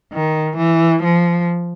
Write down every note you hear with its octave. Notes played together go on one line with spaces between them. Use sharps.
D#3
E3
F3